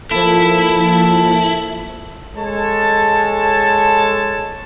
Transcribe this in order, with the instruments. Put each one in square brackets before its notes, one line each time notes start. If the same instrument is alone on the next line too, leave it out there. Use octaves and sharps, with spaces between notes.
[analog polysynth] F3 A#3 [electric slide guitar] E4 [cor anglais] A4
[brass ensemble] G#3 A4 C#5 A5